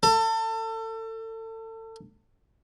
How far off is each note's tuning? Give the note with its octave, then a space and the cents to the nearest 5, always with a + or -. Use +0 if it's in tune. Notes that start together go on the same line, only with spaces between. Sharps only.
A4 +30